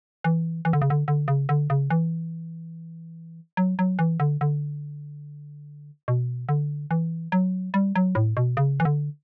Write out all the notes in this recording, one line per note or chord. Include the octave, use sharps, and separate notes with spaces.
E3
E3
D3
C#3
D3
D3
C#3
D3
C#3
E3
F#3
F#3
E3
D3
D3
B2
D3
E3
F#3
G3
F#3
A2
B2
C#3
E3
D3